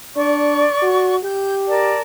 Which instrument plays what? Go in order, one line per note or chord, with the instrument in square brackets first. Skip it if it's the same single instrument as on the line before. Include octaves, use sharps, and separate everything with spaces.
[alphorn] D4 [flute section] D5 C#6
[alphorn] F#4
[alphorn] G4 [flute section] G6
[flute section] A#4 D5 A5